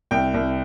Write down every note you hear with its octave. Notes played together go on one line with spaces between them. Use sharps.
C2 G5
C2